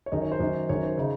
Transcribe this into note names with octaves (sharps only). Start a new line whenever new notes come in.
C#5
F#2 D#3 D#5
C#5
C5
F#2 D#3
F#2 D#3 C#5
C5
C#3 D#4